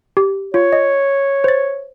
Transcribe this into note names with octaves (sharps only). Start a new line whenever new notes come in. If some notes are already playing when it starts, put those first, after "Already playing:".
G4
F4 C#5
D#5
C5 A6